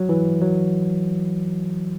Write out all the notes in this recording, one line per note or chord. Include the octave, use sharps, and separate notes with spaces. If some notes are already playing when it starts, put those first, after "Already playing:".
Already playing: F#3
E3
F#3